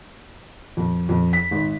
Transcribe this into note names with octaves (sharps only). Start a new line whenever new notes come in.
F2
F2
B6
G#1